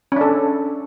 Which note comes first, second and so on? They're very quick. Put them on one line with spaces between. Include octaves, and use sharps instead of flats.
C#4 D4 A4